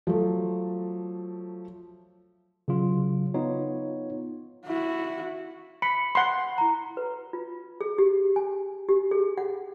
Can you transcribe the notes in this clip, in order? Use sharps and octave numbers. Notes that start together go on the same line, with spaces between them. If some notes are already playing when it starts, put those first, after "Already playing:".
F3 F#3 A3
C#3 F#3 F4
B3 D#4 F4 C#5
E4 F#4
B5 C#7
F#5 B5 C6
E4 A#5
B4
F4
G#4
G4
G#5
G4
G#4
F#5